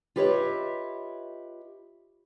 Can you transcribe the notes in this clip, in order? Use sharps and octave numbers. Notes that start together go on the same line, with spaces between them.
F4 G4 B4 C#5 D#5 E5